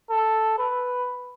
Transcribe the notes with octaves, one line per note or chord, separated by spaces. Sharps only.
A4
B4